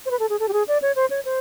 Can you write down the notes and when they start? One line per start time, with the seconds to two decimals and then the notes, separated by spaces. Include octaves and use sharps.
0.06 C5
0.11 B4
0.19 A4
0.30 G#4
0.40 A4
0.49 G4
0.53 G#4
0.68 D5
0.82 C#5
0.96 C5
1.10 C#5
1.25 C5